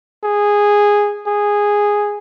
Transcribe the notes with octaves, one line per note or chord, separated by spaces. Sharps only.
G#4
G#4